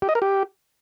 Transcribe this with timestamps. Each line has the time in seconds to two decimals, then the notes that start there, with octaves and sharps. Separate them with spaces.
0.02 G4
0.09 D#5
0.15 A#4
0.22 G4